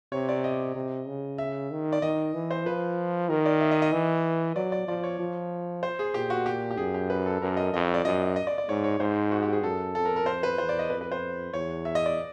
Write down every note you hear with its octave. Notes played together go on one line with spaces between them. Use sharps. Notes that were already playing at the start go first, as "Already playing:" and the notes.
C3 C#5
D5
D#5
C3
C#3
E5
D#3
D5
D#3 D#5
E3
C5
F3 B4
D#3 A#4
D5
E5
D#5
D#5
E3
F#3 D5
D5
F3 D5
C#5
F3
C5
G#4
A#2 G4
F#4
G4
G4
F#2 G#4
G4
B4
A4
F#2 A#4
D#5
F2 D#5
D5
F#2 D#5
D#5
D5
D5
G#2 C#5
C#5
G#2 C5
F#4
G4
G#4
F#2 A4
F2 A4
A#4
A#4
C5
B4
E2 C5
D5
D#5
F2 B4
B4
C5
E2 C#5
E5
D#5
D5